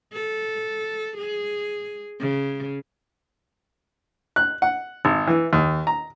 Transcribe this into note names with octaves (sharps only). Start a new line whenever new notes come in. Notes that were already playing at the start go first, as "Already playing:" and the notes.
A4
G#4
C#3
F#6
F#5
G#1
E3
D#2
A#5